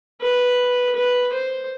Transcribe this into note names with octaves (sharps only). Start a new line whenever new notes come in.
B4
B4
C5